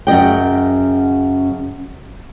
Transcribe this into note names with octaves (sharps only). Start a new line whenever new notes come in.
F#2 C#3 D#5 G5